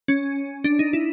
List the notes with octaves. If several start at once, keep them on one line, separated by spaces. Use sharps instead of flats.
C#4
D4
D#4
E4